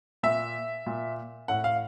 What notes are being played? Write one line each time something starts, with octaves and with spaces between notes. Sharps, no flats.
A#2 E5
A#2
A2 F#5
F5